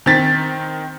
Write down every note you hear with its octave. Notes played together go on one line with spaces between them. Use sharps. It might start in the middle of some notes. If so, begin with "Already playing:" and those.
D#3 C4 A6 B6